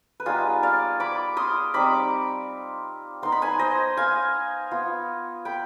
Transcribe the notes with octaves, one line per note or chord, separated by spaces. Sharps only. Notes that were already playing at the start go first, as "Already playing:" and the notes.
B4
G3 B3 D#4 F4 G#4
D5 F5
B5 D6
C6 D#6
G3 C4 D#4 B5 D6
B3 D#4 C6
B5
G#5 C6
C5 D#5
F5 G#5
B3 F4
G5 B5